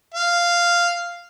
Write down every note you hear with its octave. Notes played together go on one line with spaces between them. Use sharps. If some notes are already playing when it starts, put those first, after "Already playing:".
F5